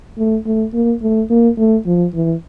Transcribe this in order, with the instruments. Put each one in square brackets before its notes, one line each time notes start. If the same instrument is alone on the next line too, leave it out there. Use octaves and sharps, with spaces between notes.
[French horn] A3
A3
A#3
A3
A#3
A3
F3
E3